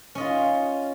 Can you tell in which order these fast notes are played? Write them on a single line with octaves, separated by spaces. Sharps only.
C#4 D#5 F4